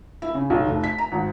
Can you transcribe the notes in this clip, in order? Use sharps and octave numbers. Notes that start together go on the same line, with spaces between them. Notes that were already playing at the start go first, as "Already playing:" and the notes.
E4
C#3
B1
F1
B6
A#5
G#1